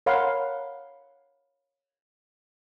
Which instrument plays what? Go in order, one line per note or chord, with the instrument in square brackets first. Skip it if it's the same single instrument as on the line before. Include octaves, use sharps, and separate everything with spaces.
[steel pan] A#4 C#5 F5 F#5 B5 C6